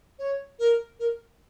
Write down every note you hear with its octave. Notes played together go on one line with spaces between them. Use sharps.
C#5
A#4
A#4